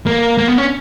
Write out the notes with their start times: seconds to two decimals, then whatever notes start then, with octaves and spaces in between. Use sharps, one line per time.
0.06 A#3
0.38 A#3
0.48 B3
0.58 C#4